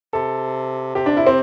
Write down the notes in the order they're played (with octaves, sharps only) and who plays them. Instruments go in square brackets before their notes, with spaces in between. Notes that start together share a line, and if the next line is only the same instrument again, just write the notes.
[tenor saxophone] C3 [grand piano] A4
[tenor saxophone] C3 [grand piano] G4
[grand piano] D4
E4
C4